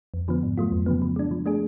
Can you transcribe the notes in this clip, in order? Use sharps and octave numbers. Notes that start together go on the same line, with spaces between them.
F2
D3 F3 B3
G#2
F#3 A3 F4
F2
C#3 F3 B3
F3
G#3 D4
F3
A3 D4 G#4